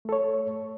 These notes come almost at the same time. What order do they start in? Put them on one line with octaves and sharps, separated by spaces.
A3 A4 C#5